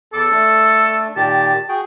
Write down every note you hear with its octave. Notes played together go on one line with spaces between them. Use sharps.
E2 A4 D6
A3 D4
A#2 D#3 G4 A5
F#4 G#4 G5